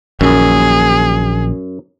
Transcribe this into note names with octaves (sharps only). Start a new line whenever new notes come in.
A#1 F#2 A#2 D#3 G#4